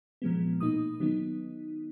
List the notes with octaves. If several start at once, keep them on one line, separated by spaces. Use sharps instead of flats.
A#2 F3 G#3 B3
B2 A#3 D#4 D#6
D#3 F#3 B3 D#4